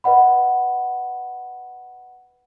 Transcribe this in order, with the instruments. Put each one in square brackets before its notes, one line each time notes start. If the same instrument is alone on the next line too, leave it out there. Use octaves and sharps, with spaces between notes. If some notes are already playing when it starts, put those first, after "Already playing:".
[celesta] B4 D#5 F#5 B5